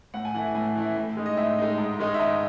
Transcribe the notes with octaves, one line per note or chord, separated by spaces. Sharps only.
A2 F#5
G#5
E3 A3 E4 F#5
A2 G#5
E3 A3 E4
A2
G#3 D#4
D#5
A2 E5
G#3 D#4
G#2
D#3 G#3 D#4
E5
G#2 D#5